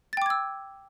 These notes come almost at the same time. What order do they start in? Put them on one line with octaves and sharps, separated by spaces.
A6 G5 D6 G#6 E6